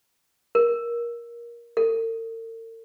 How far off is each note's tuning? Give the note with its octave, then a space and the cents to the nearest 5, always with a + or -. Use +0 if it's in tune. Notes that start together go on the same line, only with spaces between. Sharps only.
A#4 +15
A#4 -45